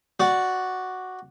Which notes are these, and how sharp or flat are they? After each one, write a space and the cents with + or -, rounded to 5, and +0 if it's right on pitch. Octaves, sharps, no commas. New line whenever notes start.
F#4 +0 D5 +0